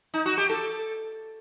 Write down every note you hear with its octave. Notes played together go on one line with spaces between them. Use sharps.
D#4
F#4
G4
A4